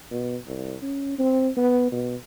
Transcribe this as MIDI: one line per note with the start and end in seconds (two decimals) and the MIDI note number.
0.11 0.36 47
0.46 0.75 36
0.82 1.14 61
1.18 1.50 60
1.57 1.92 59
1.92 2.15 47